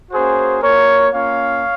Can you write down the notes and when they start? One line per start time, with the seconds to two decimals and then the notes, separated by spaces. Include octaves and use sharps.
0.11 A#3 C#4 F#4 G#4 C5
0.61 A#3 F4 A#4 C#5
1.12 A#3 C#4 F4 C#5 F5